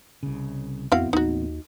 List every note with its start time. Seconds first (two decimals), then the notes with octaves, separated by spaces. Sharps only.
0.23 C2 C#3
0.92 A1 F2 B3 C4 E4 F#4 F5
1.13 D#2 D#4 F#4